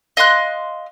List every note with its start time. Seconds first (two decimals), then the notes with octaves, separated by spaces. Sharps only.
0.17 D#5 F5 C6 F#6